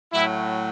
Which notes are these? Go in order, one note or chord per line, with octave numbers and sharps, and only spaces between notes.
A2 F#3 E4